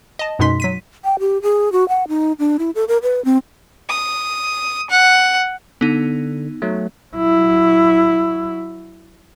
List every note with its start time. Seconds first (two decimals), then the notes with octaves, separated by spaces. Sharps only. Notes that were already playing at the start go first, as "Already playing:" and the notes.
0.19 D#5 A5
0.39 F#2 B2 G#3 D#4 C6 B6
0.60 F#3 B6 D#7
1.04 G5
1.19 G4
1.42 G#4
1.72 F#4
1.89 F#5
2.08 D#4
2.39 D4
2.59 E4
2.75 A4
2.88 A#4
3.03 B4
3.25 C4
3.89 D#6
4.90 F#5
5.81 D3 B3 D#4
6.62 F#3 A3
7.14 F#3 E4